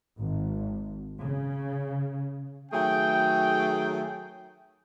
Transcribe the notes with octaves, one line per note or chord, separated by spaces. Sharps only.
G#1
C#3
D#3 F#3 A3 G#4 G5